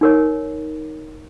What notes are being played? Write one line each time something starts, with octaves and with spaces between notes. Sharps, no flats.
D#4 A#4 C#5